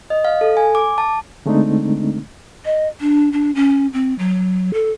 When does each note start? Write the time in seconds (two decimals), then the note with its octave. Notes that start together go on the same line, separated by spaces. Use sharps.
0.10 D#5
0.25 F5
0.41 A4
0.57 G#5
0.75 D6
0.98 A5
1.46 D3 G#3 A3 C4 D4 D#4
2.65 D#5
3.01 D4
3.32 D4
3.55 C#4
3.93 C4
4.19 F#3
4.74 A4